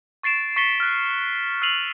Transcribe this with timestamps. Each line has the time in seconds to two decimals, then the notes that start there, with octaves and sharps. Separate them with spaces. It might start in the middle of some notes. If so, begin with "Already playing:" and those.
0.23 C#6 A6 C7 D7 E7
0.56 C#6 A6 B6 C#7 G7
0.80 F6 F#6
1.62 E6 F6 C7 D#7 F7 F#7